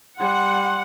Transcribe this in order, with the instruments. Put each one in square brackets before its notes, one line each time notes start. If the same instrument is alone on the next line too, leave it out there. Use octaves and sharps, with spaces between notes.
[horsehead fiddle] G3 [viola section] F#5 [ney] C6